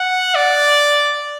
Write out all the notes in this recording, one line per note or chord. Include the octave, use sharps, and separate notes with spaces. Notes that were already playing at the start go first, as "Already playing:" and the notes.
Already playing: F#5
D5